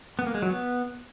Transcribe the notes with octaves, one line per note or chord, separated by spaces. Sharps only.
B3
A#3
G#3
F#3
B3